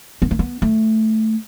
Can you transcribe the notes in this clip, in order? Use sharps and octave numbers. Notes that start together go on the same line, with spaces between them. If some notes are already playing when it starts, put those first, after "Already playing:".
B3
A3
B3
A3